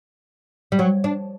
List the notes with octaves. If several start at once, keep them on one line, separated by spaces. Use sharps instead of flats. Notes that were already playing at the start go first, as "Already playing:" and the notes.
G3
F#3
D4